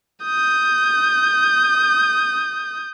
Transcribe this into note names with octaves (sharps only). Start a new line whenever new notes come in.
D#6 G6